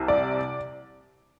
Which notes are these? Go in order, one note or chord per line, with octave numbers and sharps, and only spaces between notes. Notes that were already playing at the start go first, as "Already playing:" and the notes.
Already playing: C2 C3
D5